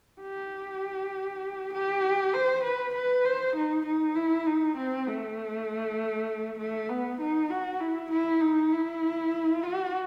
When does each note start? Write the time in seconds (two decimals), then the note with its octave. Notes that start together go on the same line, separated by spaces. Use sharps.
0.21 G4
1.73 G4
2.34 C5
2.64 B4
2.94 B4
3.24 C5
3.56 D#4
3.85 D#4
4.15 E4
4.46 D#4
4.76 C4
5.07 A3
6.59 A3
6.89 B3
7.20 D#4
7.50 F#4
7.80 E4
8.11 E4
8.41 D#4
8.72 E4
9.63 F#4